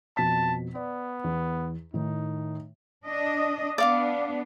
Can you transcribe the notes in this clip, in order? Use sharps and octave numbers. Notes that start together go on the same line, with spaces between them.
F2 B2 A5 B6
B3 D5
E2
A2 D#3 D#4
D4 D#5
B3 D4 D5 F5 D6